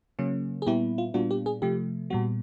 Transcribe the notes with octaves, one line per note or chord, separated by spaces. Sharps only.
C#3 F#3 A#3 C#4
G#4
A#2 G3 B3 E4 G4
F4
A#2 G3 B3 D4 F4 F#4
G4
G#4
C3 F3 A3 G4
A#2 G3 B3 F#4